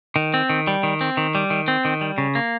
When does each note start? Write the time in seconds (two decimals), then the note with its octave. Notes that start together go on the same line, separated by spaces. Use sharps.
0.16 D#3
0.34 C4
0.50 D#3
0.67 G3
0.83 D#3
1.01 C4
1.17 D#3
1.35 G3
1.50 D#3
1.68 C4
1.85 D#3
2.01 G3
2.18 C#3
2.35 A#3